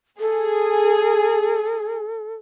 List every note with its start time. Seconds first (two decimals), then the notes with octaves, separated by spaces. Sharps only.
0.20 G#4 A4